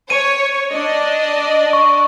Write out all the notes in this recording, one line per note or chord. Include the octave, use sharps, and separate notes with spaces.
C#5 D#7
D4 D5 D#5
C#6